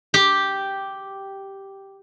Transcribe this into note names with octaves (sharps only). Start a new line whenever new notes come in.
G4